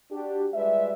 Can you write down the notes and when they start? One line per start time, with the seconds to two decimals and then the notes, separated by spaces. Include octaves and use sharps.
0.12 D4 F#4 G4
0.54 G3 G#3 F4 B4 D5 E5